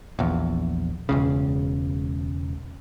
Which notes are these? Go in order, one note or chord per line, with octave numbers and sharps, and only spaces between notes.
A#1 E2
E1 C#2 C#3